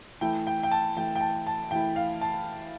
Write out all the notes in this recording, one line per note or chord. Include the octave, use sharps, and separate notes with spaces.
E3 A3 E4 G5
G5
G5
A5
E3 A3 E4 G5
G5
A5
A5
E3 A3 E4 G5
F5
A5